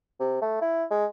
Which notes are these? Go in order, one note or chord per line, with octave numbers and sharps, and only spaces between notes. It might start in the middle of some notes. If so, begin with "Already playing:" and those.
C3
A3
E4
G#3